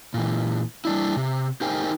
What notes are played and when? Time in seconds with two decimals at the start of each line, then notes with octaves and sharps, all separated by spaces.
0.14 A#2 E3
0.85 G3 D4 E4
1.17 C3
1.61 D#4 G4 A#4 C5 G5 G#5